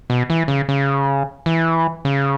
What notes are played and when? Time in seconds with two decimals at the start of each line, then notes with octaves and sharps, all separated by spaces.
0.10 B2
0.30 E3
0.48 C#3
0.69 C#3
1.46 E3
2.05 C#3